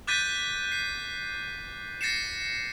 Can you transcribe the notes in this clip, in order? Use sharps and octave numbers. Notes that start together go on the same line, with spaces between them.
D6 F#6 G6 A6 B6 D#7
C7
A6 A#6 C7 C#7 E7